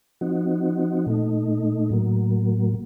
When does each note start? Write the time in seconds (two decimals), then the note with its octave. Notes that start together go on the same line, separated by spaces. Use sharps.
0.21 F3 C4 D#4 F#4
1.06 A#2 A3 D#4
1.90 A2 F#3 A#3